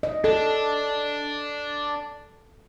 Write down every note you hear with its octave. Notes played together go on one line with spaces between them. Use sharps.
D#5
D4 A4